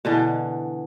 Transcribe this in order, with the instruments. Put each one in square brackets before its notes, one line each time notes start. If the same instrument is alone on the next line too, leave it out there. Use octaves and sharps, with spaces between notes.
[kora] B2 D3 E3